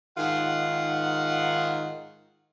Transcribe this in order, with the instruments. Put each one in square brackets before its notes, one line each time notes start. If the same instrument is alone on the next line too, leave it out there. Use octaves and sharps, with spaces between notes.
[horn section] G#2 D#3 F4 F#5